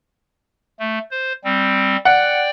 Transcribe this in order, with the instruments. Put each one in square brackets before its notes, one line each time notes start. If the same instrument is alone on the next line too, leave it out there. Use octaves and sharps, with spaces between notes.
[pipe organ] A3
C5
G3 C4
[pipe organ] D5 G5 [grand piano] F#5